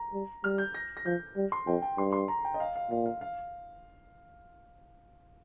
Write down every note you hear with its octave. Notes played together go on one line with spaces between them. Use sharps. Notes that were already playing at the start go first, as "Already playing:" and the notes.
Already playing: A#5
G3
G3 F6
G6
A#6
A#6
F3 G6
G3
C6
F2 G5
G5
G2 C6
C6
A#5
G5
D#5
F5
F5
A#2 F5
F5
F5